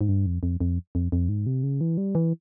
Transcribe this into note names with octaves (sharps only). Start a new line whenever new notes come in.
G#2
G2
F2
F2
F2
F2
F2
G#2
C3
C#3
E3
G3
E3